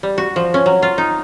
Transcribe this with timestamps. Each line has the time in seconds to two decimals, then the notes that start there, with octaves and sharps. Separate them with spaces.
0.03 G3
0.18 F#4
0.36 F3
0.54 C#4
0.66 F#3
0.82 F4
0.98 D#4